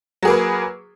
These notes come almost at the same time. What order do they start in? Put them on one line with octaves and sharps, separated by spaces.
F#3 G#4 A#3 B4